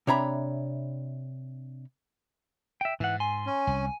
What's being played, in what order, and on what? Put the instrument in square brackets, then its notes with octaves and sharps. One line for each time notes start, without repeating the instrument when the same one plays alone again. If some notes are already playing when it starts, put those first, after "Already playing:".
[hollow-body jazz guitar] C3 D4 C#5 E5 A#5 B5
[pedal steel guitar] E5 G5
[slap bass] G#2 [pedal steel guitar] E3 F#5
[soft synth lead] G#5 [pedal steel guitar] C6
[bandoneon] C#4
[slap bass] C2 [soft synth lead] G#5